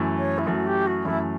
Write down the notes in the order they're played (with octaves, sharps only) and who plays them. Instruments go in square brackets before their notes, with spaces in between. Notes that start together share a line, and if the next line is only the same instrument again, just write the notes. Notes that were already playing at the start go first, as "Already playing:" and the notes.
Already playing: [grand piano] F#2 E3 A3
[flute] C#5
E4
[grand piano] F#2 E3 A3 [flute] F#4
[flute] G4
F#4
[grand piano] F#2 E3 A3 [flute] E4